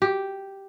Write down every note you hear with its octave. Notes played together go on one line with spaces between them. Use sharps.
G4